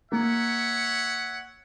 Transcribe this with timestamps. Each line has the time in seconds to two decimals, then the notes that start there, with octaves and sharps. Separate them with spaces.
0.12 A#3 C#5 E5 F#5